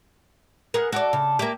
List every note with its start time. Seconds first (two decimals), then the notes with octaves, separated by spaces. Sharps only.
0.74 B3 G#4 A#4 F#5
0.92 F#4 A4 D5 D6
1.13 C#3
1.39 A#3 G4 E5 D6